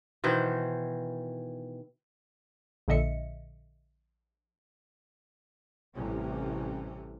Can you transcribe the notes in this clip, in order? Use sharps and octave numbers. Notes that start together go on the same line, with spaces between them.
B2 D#3 E3 C5
A#1 A#2 D3 D#5 E5 C#7
A1 A2 C3 E3 G3 C#4